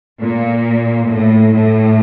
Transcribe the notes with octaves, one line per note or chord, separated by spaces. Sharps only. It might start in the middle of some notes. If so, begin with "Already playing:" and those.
A#2
A2
A2